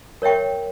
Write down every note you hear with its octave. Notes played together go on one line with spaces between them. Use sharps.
A#4 C#5 E5 G5 C#6